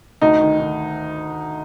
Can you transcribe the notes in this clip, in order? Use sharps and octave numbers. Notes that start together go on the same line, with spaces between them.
D2 D#4
D#3
D#3